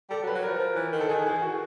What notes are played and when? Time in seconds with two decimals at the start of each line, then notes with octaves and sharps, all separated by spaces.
0.10 G3 A4
0.23 F#3
0.27 B4
0.35 F#3
0.43 F3 A#4
0.59 F3
0.76 E3
0.93 D#3
1.01 A4
1.09 D#3 G#4
1.26 E3 G#4
1.42 F#4